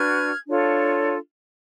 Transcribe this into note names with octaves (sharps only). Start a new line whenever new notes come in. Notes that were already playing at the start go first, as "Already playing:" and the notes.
Already playing: D4 F#4 B4 F6 G#6
D4 F4 A4 C#5